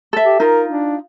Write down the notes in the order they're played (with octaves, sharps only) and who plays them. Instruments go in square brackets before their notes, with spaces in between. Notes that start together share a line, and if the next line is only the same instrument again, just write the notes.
[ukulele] A4 E5
[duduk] G4
[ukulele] D#4 F4 [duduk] A#4
[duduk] D4